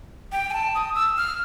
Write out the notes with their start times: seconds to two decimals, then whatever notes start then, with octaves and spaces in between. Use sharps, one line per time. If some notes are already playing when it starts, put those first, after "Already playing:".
0.32 G5
0.50 G#5
0.54 A5
0.75 D#6
0.95 E6
1.17 F6